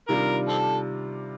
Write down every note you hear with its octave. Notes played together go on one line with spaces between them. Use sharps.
C3 D#3 G3 D4 F4 A#4
C4 A4